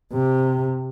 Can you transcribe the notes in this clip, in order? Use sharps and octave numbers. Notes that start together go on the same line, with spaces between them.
C3